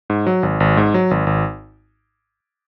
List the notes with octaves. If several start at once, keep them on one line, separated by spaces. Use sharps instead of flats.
G#2
F#3
G#1
G#1
G#2
F#3
G#1
G#1